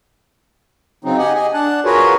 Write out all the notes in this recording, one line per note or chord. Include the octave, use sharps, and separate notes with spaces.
C#3 F#3 C4 D#4
G4 D#5 F#5 G#5
G#4 D#5 G#5
D4 F#5 A5
F4 F#4 G#4 A#4 B4 C#5